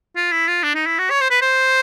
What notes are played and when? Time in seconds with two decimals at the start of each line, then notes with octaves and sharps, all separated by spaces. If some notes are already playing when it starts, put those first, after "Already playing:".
0.16 F4
0.32 E4
0.48 F4
0.63 D4
0.75 D#4
0.86 E4
0.99 F#4
1.10 C#5
1.21 C5
1.30 B4
1.42 C5